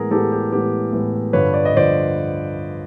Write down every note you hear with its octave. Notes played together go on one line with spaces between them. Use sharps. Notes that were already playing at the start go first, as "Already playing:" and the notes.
Already playing: A2 E3 G#3 B3 G#4 A#4
A2 E3 G#3 B3 G4 A4
G4
A2 E3 G#3 B3 G4
A2 E3 G#3 B3
G2 D3 F3 B4 C#5
D5
D#5
G2 D3 F3 C5 D5